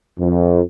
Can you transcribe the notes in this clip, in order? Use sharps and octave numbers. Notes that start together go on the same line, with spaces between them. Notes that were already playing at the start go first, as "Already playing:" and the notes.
F2